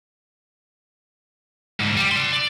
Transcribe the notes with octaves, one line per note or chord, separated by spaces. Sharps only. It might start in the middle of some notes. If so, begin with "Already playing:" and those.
D2 G#2
G3
D5 C6
D5